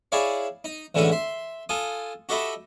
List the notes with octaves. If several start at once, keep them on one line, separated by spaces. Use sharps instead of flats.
E4 G#4 C#5 D5 F5
D#4
A1 D3 E3 G#3 C#4 F#4
E5 C6
F4 A4 G#5 D#6
F#4 G4 A4 D#5 E5 B5